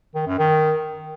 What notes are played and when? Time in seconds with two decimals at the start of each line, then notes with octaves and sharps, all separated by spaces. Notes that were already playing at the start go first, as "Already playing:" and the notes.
0.15 D#3
0.27 F#2
0.39 D#3